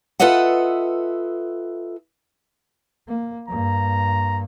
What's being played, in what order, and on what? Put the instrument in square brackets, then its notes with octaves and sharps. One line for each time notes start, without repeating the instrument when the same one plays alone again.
[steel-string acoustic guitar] F4 A4 B4 D#5 E5 F#5
[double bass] A#3
[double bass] G2 A#3 [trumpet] A#5